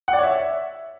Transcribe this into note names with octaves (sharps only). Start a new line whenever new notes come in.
F#5
D5
C#5
E5